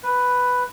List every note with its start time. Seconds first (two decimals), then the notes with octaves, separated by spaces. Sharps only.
0.03 B4